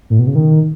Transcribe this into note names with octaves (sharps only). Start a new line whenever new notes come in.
A2
B2
C#3
D#3